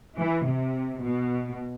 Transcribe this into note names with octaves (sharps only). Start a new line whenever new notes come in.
E3
C3
B2